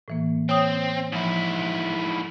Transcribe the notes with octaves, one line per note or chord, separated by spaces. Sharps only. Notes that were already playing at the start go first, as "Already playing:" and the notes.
A2 E3 A#3
C4 C#5 G5 D#6
G#2 F3 E4